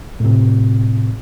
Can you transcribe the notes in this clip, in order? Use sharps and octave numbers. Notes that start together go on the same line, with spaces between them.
A2 C3